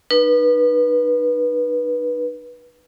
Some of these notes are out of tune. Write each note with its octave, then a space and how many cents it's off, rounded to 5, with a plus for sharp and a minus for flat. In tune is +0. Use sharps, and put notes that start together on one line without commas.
D#4 -40 B4 -20